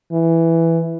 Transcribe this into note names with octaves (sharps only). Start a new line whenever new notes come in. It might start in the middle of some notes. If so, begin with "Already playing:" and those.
E3